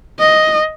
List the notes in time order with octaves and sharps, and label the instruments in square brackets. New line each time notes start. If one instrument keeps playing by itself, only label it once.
[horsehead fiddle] D#5